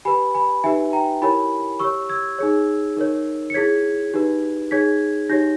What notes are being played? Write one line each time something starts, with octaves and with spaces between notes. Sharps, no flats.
G4 B4 G#5 B5
G#5 B5
D#4 G4 B4 E5 G#5
G5 A#5
E4 G4 A#4 C#5 G#5 B5
G4 C#5 C#6 E6
E6 G#6
D#4 G#4 C#5
D#4 A#4 C#5
C#7
E4 G#4 C#5 G#6 B6
D#4 G4 B4
D#4 G#4 C#5 G#6 B6
D#4 G4 C#5 G6 A#6